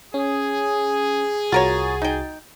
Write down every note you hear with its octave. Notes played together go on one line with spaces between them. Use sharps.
C#4 G#4
C2 F4 F#4 A#4 C#5 A6
D#4 G5